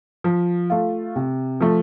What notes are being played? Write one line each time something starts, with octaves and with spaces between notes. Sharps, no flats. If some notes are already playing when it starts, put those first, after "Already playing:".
F3
A3 F4
C3
F3 A3